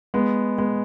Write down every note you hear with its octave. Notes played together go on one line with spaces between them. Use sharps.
G#3 B3
G#3 B3